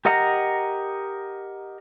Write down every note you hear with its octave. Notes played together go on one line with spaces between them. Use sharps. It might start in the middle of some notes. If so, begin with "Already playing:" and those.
G4 A#4 D#5 F#5 A#5